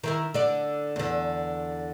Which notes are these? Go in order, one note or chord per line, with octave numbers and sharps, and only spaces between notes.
D#3 E4 A#4
D3 D5
E2 D3